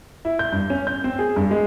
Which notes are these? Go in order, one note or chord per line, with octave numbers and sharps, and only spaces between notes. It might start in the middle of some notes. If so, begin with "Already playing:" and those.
E4
G6
G2
C#4
G6
C4
G#4
G2
G#3